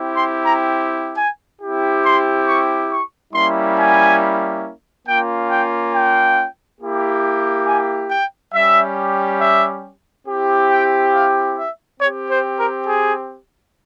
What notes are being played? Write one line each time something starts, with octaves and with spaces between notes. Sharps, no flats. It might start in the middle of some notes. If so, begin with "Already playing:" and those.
Already playing: C4 E4 G4
C6
A#5
G#5
C4 E4 G4
C6
C#6
C#6
G3 A#3 C#4 E4 C6
G#5
A#3 C#4 F4 G5
G5
G5
A#3 E4 G4
G#5
G5
G3 C#4 G4 E5
E5
C4 E4 G4
G5
F5
E5
C4 G4 C#5
C5
A#4
G#4